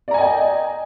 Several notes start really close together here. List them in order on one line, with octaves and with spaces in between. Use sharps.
D5 A#5 G#5 D#5 G5